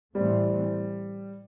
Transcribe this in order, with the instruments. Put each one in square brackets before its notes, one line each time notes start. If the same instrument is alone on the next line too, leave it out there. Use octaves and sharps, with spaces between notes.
[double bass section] A2 E3 A3 C4 [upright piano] G3